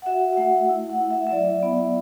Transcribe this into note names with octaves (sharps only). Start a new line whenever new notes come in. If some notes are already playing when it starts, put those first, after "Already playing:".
F#5
F#4 E5
E5
A3 F#5
E4
F#5
E4
E5
E5
F#3 D5
B3